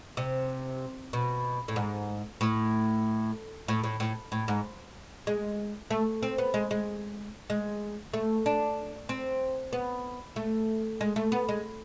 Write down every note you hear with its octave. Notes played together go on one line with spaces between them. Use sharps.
C3
B2
A2
G#2
A2
A2
A2
A2
A2
G#2
G#3
A3
C4
B3
G#3
G#3
G#3
A3
D4
C4
B3
A3
G#3
A3
B3
G#3